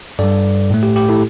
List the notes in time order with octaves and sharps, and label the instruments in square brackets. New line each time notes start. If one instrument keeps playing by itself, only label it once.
[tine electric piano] G2 G3 A4 D5
A2 A3
G4
G4
E4 A4